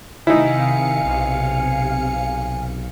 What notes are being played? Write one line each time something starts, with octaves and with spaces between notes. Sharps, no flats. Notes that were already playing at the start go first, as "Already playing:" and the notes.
C3 D#3 D#4 E4 F5 G#5 C#7
B1